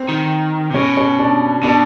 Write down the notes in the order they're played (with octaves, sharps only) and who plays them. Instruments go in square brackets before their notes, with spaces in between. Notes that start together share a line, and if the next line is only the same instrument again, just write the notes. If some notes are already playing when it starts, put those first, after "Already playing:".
Already playing: [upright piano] C4
[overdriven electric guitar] D#3
C3
[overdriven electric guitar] B2 [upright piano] C#4
[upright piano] C#4
D4
[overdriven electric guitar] B2 [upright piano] D4